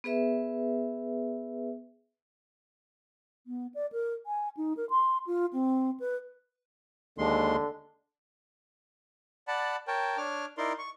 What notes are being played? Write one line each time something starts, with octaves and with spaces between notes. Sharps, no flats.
B3 G#4 B4 E5
B3
D5
A#4
G#5
D#4
A#4
C6
F4
C4
B4
D#2 D3 G#3 C6
D5 F#5 A5 B5
A#4 C#5 G5 A5
D4 C#5 D6 F6
D#4 E4 A#4 D5 C6
C#6